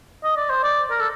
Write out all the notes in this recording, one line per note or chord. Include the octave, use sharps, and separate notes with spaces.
D#5
D5
C5
D5
A#4
A4